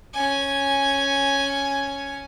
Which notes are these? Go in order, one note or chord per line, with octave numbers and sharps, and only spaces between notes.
C#4 G#5